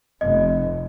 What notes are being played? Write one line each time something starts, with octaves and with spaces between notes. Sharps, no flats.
F1 D#5